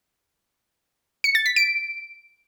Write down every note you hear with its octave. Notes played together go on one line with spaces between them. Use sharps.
C#7
A6
B6
D7